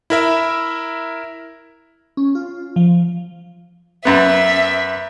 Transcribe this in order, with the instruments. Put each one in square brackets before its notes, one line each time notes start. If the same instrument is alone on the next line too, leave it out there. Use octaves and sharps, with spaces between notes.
[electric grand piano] E4 A#4 E5
[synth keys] C#4
F4
F3
[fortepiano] F#2 B3 [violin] E5